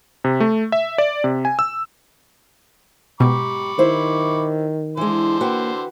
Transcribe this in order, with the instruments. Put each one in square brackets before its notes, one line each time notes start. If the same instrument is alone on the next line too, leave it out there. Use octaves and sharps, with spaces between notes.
[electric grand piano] C3
A3
E5
D5
C3
G#5
E6
[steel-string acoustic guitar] G#2 G4 [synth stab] B2 [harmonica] B5 C#6 D6
[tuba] D#3 [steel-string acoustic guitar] E4 C5
[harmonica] D3 C5 [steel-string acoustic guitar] E3 G#3
[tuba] A#3 [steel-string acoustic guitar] F#4 B4 G5